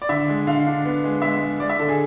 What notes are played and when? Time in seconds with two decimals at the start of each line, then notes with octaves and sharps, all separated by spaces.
0.02 D5
0.09 D3 E5
0.28 G#3
0.47 D3 F5
0.66 D4
0.85 B3
1.04 G#3
1.22 G#3 E5
1.41 G#3
1.59 G#3 D5
1.69 E5
1.79 D3 A4
1.89 G#4